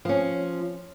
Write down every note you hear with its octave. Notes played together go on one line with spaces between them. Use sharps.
F3 C#4